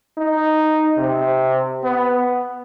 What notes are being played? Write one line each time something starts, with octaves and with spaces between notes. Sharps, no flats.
D#4
C3
B3